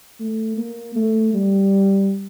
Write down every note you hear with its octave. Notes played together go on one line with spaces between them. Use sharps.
A3
A#3
A3
G3